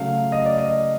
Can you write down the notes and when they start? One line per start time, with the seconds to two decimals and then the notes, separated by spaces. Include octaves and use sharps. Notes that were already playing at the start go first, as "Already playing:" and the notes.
Already playing: C#3 F#3 A3 F5
0.32 D#5
0.46 D5
0.58 D#5